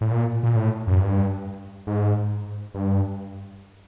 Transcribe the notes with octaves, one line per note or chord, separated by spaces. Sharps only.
A2
A#2
A#2
A2
F#2
G2
G#2
G2